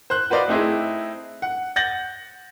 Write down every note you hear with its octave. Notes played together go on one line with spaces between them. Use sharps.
C5 F#6
F#4 B4 C5 D5 D#5 F5
A3 C4 D#4 E4 G#4
F#5
F#5 G6 A6 A#6 F#7